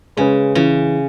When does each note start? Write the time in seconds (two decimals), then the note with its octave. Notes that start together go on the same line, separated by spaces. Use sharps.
0.17 C#3 G#3 C#4 G#4 B4
0.55 C#3 E3